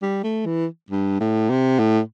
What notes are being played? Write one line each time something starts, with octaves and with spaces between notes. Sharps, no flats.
G3
A3
E3
G2
A2
C3
A2